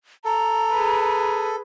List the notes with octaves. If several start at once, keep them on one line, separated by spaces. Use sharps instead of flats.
A4 A#5
G#4 B4